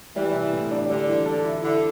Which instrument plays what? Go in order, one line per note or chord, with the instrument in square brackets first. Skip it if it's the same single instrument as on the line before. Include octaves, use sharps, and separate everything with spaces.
[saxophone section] E3 [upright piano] G3
[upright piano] C2
A2
D4
[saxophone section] D3 [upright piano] G3
[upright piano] E3
A4
E4
[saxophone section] D3 [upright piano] E4